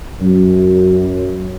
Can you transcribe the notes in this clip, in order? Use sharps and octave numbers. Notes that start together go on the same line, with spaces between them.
F#2